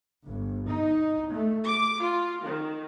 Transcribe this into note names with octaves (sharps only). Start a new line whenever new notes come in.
G1
D#4
A3
D6
F4
D#3